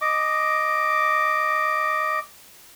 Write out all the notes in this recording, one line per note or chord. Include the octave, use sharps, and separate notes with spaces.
D#5 D6